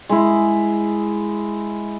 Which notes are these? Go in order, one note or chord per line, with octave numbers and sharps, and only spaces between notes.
G#3 E4